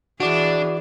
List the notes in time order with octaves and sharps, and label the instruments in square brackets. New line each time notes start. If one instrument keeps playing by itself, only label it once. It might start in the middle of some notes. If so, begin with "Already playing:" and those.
[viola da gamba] E3 G#4 [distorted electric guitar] D4 [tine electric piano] F#4 D5